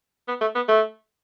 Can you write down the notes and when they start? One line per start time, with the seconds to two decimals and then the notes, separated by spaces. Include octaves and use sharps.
0.28 B3
0.41 A3
0.55 B3
0.68 A3